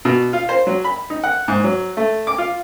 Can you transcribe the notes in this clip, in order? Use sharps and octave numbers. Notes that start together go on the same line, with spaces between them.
B2
F4
C5
F#3
B5
D#4
F#5
G#2
F#3
A3
D6
F4